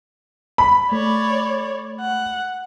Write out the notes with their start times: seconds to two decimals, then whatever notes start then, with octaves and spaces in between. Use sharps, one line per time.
0.58 B5
0.92 A3 C#5 D5
2.00 F#5